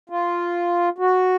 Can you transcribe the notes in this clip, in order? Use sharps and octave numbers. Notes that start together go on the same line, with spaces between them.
F4
F#4